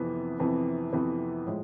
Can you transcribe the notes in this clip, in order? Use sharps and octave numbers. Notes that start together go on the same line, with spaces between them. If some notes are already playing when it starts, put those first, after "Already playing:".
Already playing: F2 C3 E3 B3
F2 C3 E3 B3
F2 C3 E3 B3
A2 F3 G#3